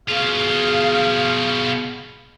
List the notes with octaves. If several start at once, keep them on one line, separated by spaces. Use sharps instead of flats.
B2 F4 G#4 F5